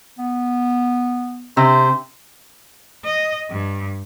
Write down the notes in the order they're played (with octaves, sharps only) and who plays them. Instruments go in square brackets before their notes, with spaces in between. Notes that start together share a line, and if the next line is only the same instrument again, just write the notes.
[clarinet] B3
[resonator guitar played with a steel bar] C3 [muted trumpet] C5
[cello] D#5
G2